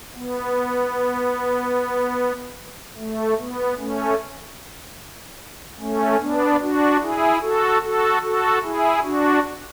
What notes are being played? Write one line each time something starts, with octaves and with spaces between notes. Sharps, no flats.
B3
A3
B3
A3 C#4
A3 C#4
B3 D4
D4 F#4
E4 G#4
F#4 A4
F#4 A4
F#4 A4
E4 G#4
D4 F#4